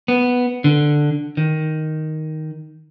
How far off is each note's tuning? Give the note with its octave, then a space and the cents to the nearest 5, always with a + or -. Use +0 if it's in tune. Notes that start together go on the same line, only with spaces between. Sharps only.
B3 +0
D3 +5
D#3 +5